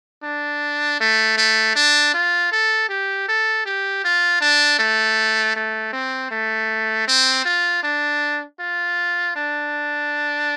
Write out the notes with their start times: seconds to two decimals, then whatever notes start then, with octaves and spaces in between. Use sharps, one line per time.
0.23 D4
1.00 A3
1.37 A3
1.75 D4
2.14 F4
2.52 A4
2.89 G4
3.28 A4
3.66 G4
4.04 F4
4.41 D4
4.79 A3
5.56 A3
5.93 C4
6.31 A3
7.08 C4
7.45 F4
7.83 D4
8.60 F4
9.36 D4